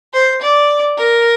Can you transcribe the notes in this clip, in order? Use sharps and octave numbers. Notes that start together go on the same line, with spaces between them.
C5
D5
A#4